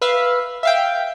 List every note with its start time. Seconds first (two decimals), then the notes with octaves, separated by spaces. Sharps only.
0.02 B4 E5 F5
0.63 E5 F5 G5